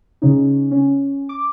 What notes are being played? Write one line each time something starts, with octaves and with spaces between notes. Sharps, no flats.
C#3 C#4 D#4
C#4
D6